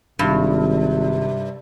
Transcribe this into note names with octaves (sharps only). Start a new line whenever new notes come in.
G#1 G2 C3